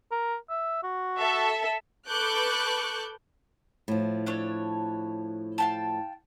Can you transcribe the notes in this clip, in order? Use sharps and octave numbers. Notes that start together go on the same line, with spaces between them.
A#4
E5
F#4
A4 E5
A4 B4 C#6 D6 F#6 G6
A2 F3
D4 A4 C#5
F5 G5 A5